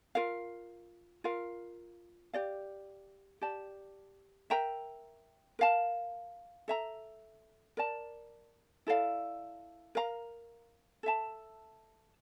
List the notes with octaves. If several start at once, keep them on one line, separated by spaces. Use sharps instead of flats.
F4 A#4 F5
F4 A#4 F5
G4 D5 F5
G4 D5 A5
A#4 E5 G5 A#5
A#4 F5 A5
A4 E5 A#5
A#4 D5 A5
E4 A4 D5 F5
A#4 F5 A#5
A4 E5 A5